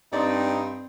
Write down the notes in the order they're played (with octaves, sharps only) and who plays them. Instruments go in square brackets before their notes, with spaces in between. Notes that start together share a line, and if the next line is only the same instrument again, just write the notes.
[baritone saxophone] G2 [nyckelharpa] C4 [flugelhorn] D#4 [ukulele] D5